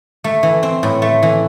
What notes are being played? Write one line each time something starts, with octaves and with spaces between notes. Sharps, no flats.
A3
E3
C4
A2
A3
E3